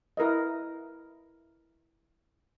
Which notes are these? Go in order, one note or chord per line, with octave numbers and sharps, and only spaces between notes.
E4 A#4 B4 D#5